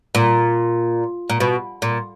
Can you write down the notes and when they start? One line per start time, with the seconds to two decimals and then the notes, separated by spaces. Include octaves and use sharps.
0.15 A#2
1.29 A#2
1.40 B2
1.82 A#2